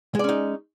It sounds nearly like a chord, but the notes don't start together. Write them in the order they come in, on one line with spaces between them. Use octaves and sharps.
G#3 D5 C#4 D#4